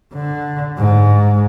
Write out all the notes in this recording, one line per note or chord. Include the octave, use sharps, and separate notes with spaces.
D3
G#2